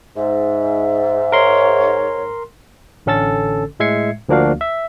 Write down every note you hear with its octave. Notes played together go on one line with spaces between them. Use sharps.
G#2 E5
A#4 C#5 C6
A1 D3 C#4 A4 E6 A6
A2 G#3 E5 G#6 C7 C#7
D2 F3 A#3 D4 F#4 F5
E5